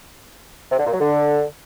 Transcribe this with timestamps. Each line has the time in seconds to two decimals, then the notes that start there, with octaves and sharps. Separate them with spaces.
0.71 C3
0.79 D3
0.86 A#2
0.93 F#3
1.00 D3